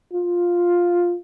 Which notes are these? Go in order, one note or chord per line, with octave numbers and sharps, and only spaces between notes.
F4